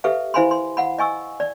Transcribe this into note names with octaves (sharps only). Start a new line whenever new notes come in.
G4 A4 B4 E5 F5
E4 C5 F5 G#5 B5 C6
C6
F5 F#5 B5
D#5 G#5 C#6 E6
D5